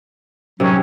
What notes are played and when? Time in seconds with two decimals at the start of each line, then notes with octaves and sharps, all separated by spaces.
0.60 C3 D#3 F#3 G#3 C#4